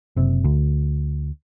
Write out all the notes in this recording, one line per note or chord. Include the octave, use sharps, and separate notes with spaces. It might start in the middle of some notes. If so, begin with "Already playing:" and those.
F#1 C3
D2